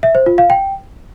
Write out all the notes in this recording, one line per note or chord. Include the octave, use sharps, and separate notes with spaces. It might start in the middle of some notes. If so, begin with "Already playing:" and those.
E5
C5
F4
F5
G5